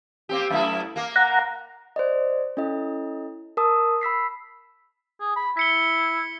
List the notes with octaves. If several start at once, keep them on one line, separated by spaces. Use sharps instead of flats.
A#3 C4 G4
F#2 A3 E4
A#3 A#4
F#5 A#5
C5 D5 D#5
C#4 E4 A4 D#5
A#4 A5 D#6 E6
B5 E6 B6 C7
G#4
B5
E4 B6 C#7 G7